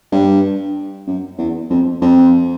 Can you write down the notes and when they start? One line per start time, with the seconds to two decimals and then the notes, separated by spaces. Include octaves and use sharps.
0.12 G2
1.07 F#2
1.38 E2
1.70 F2
2.01 F2